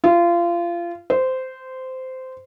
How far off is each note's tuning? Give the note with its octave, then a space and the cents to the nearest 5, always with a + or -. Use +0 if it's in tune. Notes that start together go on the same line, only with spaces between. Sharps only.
F4 -25
C5 -15